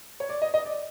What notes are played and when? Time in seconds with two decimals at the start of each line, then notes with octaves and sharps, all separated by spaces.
0.20 C#5
0.29 D5
0.42 D#5
0.54 D#5
0.66 D5